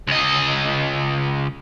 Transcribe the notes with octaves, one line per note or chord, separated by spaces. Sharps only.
C#2 D#5